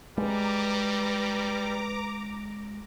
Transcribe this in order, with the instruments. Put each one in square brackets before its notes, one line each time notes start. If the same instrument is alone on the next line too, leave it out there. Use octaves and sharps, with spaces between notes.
[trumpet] G3 [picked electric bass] G#3 [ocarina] B4 [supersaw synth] A#5 D6